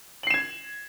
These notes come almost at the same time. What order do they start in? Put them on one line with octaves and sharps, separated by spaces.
F#7 C7 E7 G#6